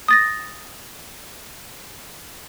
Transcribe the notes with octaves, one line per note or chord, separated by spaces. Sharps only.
D#6 A6 A#6